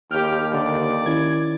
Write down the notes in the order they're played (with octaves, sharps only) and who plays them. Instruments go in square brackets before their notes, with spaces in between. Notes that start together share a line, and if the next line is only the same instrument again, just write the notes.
[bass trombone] D#2 [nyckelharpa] G4 G5 [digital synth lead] F6
[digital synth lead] D3 [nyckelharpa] D5
[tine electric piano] D#3 C#4 E4 [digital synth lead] G#6